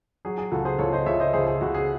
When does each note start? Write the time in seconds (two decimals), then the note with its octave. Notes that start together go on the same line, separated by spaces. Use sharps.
0.25 F#3 G#4
0.38 G#4
0.52 C#2 F#4 A4
0.65 G#4 C5
0.79 C#2 A4 C#5
0.93 C5 D#5
1.06 C#2 C#5 E5
1.20 C5 D#5
1.33 C#2 G#4 C5
1.47 G#4
1.61 C#2 F#4
1.74 G#4